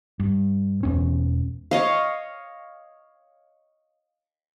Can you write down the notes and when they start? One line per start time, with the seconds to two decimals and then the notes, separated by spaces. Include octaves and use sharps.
0.20 G2
0.83 E1 E2 C#4
1.71 C#5 D#5 F5